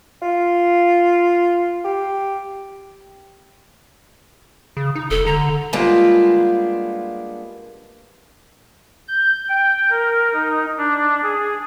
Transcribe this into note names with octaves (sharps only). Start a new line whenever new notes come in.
F4
G4
C#3
D#4
E1 A4
D3 A#5
G3 G#3 A#3 B3 D4 F4
G6
G5
A#4
D#4
D4
G#4